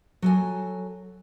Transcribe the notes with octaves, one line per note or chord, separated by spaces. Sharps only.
F#3 A4 G#5